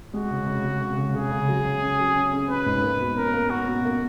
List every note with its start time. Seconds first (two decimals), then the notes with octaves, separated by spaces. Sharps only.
0.13 G#3 F#4
0.30 C#3
0.48 C#3
0.64 G#3
0.81 C#3
0.97 C#3
1.14 C#3 G#4
1.31 C#3
1.48 F#3
1.65 C#4
1.82 C#4
1.99 F#3
2.16 C#4
2.33 C#4
2.49 C#4 B4
2.66 G#2
2.83 A#3
3.00 B2
3.16 C#4 A#4
3.33 A#3
3.50 C#4 F#4
3.67 B2
3.85 A#3